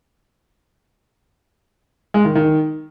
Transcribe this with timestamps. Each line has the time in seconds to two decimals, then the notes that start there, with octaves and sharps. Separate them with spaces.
2.14 G#3
2.25 D#3
2.35 D#3